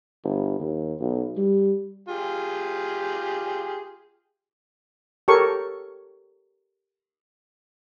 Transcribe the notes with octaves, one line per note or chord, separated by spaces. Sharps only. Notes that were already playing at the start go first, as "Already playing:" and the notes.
G1
D#2
B1
G3
F4 G4 G#4
G4 A4 A#4 C#5 C#6